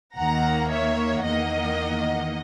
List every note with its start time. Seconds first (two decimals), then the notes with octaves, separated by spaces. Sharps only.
0.16 D#2 D#3 A#3 F#5 A#5
0.70 C#5 E5
1.24 E2 D#3 A#3 D#5 F#5